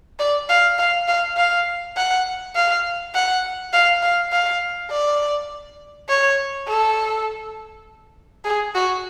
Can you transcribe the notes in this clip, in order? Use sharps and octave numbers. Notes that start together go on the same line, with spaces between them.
D5
F5
F5
F5
F5
F#5
F5
F#5
F5
F5
F5
D5
C#5
A4
G#4
F#4